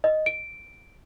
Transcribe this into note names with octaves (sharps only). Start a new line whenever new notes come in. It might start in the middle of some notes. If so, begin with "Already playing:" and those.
D#5
D7